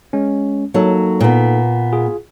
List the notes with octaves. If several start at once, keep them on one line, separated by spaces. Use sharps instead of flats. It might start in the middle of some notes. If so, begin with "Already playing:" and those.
G#3 C#4
F#3 A#3 D#4 A4
A#2 B3
F4 G#4